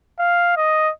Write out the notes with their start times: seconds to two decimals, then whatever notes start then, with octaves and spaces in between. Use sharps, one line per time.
0.19 F5
0.57 D#5